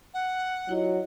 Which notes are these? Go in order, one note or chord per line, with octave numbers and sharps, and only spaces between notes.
F#5
F#3 E4 F4 D#5